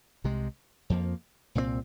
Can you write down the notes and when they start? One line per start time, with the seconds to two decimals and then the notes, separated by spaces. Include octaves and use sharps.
0.24 C2 C3 G#3
0.90 F2 F3 A#3
1.55 C2 A#2 G#3 C4